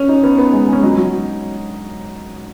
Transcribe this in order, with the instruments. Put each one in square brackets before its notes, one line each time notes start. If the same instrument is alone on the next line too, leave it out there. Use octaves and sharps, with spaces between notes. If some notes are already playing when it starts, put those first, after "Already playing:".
Already playing: [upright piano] C#4
[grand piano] D#4
[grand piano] B3 [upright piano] C#4
[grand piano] B3
G#3
G#3
[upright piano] C#4
[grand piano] F#3 [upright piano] D#4
[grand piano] F#3